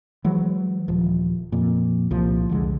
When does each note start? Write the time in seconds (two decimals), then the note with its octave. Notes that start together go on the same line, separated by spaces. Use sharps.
0.24 E3 F#3 G#3
0.88 D#1 F3
1.52 F2 A#2
2.11 C2 A#2 F3
2.49 C2 F2 D3 G#3